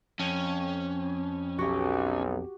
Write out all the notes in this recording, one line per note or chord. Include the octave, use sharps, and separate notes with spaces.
F2 C#4
B1 F#4 G4